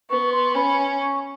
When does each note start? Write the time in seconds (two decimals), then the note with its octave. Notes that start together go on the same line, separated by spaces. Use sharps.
0.10 B3 C#6
0.33 C6
0.55 C#4 B5
1.00 C#6